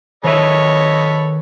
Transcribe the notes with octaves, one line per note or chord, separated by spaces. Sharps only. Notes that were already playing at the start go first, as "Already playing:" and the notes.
D#3 A4 B4 C#5 D#5 E5 B5